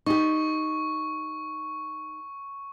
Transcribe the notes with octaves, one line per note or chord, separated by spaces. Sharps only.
D#4 G4 C#6